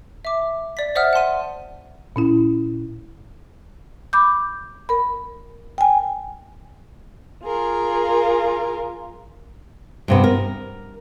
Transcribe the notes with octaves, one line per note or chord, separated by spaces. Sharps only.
E5 D6
D5 B6
C5 D5 E5 F#5 D#6 F6
F#5 A5 C6 D#7
A#2 C#4 E4
B5 D6 G6
A#4 B5
G5 G#5
F4 G#4 A#4
G2 C3 B3
A#4